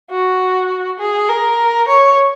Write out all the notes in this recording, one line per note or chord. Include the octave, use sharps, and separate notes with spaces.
F#4
G#4
A#4
C#5